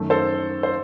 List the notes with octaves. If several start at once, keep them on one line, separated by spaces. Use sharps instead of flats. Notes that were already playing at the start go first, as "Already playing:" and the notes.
Already playing: F#2 D#3 A3
A4 C5
C5